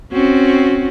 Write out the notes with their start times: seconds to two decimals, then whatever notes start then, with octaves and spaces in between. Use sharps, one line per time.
0.12 C4 C#4 F#4